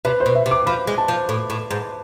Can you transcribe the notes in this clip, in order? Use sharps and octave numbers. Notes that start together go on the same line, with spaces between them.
C3 B4
C5
B2
E5
C3
D6
F3 B5
G#3
A5
F3
A2
A2
G#2